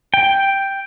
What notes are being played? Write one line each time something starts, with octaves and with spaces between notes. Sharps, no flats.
G5